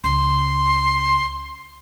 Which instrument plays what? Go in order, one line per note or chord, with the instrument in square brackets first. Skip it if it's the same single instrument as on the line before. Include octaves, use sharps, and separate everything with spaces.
[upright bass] C#2 [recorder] C6